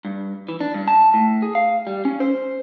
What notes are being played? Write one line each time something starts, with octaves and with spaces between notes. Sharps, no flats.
G2
E3
D4
G2
A5
A2
G#4
F5
G3
C#4
C5